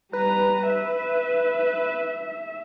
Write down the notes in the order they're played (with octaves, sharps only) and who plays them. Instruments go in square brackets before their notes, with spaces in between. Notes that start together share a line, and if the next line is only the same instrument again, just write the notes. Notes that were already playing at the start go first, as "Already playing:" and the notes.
[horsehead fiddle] G3 A#5 [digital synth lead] B4
[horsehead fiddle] E5